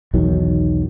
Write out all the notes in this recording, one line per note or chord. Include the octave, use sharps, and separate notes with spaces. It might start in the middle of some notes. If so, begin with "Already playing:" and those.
B1 E2 D#3 F#3